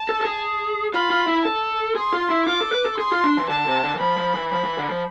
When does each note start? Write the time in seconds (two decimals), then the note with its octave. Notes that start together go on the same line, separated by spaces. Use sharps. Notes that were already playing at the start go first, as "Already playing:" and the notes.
Already playing: A5
0.09 A4
0.21 A4
0.25 G#4
0.94 F4 B5
1.10 F4
1.28 E4
1.45 A4 A5
1.95 G#4 C6
2.13 F4
2.30 E4
2.47 F4 D6
2.61 A4
2.72 B4
2.86 A4
2.98 G#4 C6
3.12 F4
3.24 D4
3.37 E3
3.49 D3 A5
3.67 C3
3.83 D3
3.96 E3
4.00 F3 B5
4.17 F3
4.35 E3
4.52 F3 B5
4.65 E3
4.78 D3
4.90 F3